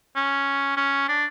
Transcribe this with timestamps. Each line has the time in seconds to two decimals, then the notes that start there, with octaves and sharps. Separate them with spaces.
0.16 C#4
0.77 C#4
1.09 D4